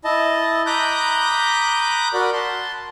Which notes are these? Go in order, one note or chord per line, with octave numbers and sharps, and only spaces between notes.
E4 D#5 A5
A#5 B5 D6 D#6 F#6 G6
F#4 A#4 D5 B5
A5 C6